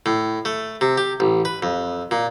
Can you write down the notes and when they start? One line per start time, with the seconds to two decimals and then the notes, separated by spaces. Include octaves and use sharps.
0.06 A2
0.45 A3
0.81 C3
0.98 G4
1.20 A1
1.45 B4
1.63 F2
2.11 A#2